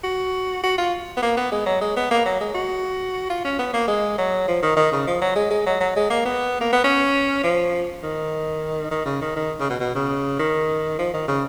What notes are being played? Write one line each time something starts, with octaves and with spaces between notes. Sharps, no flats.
F#4
F#4
F4
B3
A#3
B3
G#3
F#3
G#3
B3
A#3
F#3
G#3
F#4
F4
C#4
B3
A#3
G#3
F#3
F3
D#3
D#3
C#3
F3
F#3
G#3
G#3
F#3
F#3
G#3
A#3
B3
A#3
B3
C#4
F3
D#3
D#3
C#3
D#3
D#3
C#3
B2
B2
C#3
D#3
F3
D#3
C#3